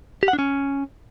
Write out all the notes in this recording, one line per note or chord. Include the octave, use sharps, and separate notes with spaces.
G4
F#5
D4
C#4